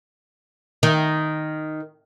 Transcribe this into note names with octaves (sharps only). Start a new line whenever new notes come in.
D#3